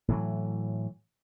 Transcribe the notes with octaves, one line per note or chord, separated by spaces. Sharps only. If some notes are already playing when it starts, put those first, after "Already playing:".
A2 E3 F#3